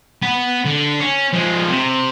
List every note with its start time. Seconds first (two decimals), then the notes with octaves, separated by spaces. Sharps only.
0.22 B3
0.65 D3
1.00 C#4
1.33 F3 G#3
1.70 C3